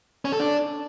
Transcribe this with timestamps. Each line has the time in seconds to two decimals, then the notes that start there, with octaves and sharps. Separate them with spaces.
0.25 C#4
0.32 A4
0.40 D4